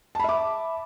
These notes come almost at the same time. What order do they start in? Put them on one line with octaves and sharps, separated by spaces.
A5 B5 E5 D6